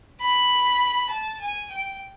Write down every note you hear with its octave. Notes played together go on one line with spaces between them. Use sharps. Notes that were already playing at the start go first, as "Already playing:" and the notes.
B5
A5
G#5
G5